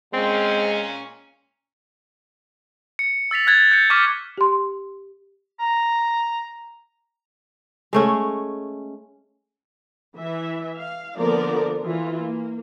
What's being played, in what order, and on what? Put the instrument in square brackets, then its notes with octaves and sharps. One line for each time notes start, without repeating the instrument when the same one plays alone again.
[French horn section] A#2 C#4 [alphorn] G#3 [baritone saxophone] C4
[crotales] C#7
E6 A6 B6 F7
F#6 G#6 A6
G6 C#7
C#6 D6 F6 B6 C#7
[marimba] G4 C6
[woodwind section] A#5
[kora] G#3 A3 C#4
[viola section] E3 E5
F5
D3 F3 A#3 B3 A#4 D5
E3 F4
A#3